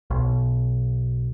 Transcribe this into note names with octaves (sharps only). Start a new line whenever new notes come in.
B1